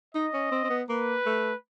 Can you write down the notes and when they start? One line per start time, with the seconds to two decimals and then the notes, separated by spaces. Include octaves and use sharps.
0.15 D#4 D#5
0.33 C#4
0.52 C4
0.64 C4
0.70 B3
0.89 A#3 B4
1.26 A3